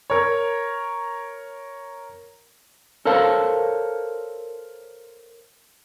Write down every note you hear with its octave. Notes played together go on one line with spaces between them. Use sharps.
A#4 C#5
A4 A#4 C5 C#5 F5 A5